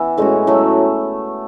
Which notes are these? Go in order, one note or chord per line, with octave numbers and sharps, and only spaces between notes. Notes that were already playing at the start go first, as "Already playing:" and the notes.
Already playing: E3 B3 E4
A2 G#3 C#4 F#4
A2 F#3 A3